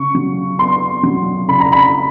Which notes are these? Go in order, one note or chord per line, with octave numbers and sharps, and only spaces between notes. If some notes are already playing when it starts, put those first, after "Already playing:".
Already playing: C#3 C#6
F#3
B3 C6
F#3
C#3 B5
A#5
B5